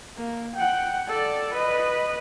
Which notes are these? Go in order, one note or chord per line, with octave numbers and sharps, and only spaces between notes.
A#3
F#5 G5
A4 D5
B4 D#5